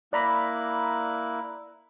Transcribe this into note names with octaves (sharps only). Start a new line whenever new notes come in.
A#3 E4 D5 A#5 B5 F#6